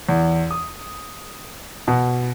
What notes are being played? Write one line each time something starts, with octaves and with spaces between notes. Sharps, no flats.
E2
D#6
B2